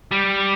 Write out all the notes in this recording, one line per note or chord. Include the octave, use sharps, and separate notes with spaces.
G3